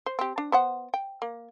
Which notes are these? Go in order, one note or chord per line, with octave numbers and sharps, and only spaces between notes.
C5
C4 G4
D4
B3 C5 F#5
G5
A#3